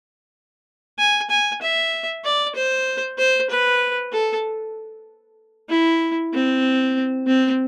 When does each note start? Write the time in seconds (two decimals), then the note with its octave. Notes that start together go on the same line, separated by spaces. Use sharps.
0.99 G#5
1.30 G#5
1.62 E5
2.25 D5
2.56 C5
3.18 C5
3.50 B4
4.13 A4
5.69 E4
6.33 C4
7.27 C4